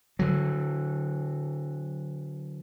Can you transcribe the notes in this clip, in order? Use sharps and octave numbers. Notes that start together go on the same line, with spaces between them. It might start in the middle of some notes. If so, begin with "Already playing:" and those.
D3 F#3